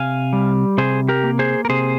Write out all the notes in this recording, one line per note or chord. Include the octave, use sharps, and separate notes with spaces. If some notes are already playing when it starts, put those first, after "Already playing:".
Already playing: C3 F5 G#5
G3
C3 G#4 C5
G4 A#4
A#3
G#4 C5
A#4
C3 G#4 C5